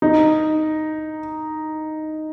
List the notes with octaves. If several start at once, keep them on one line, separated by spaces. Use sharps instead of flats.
D#4